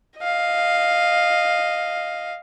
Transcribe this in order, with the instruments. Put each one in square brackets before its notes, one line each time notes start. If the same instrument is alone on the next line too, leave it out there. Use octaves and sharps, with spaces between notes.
[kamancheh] D#5 F5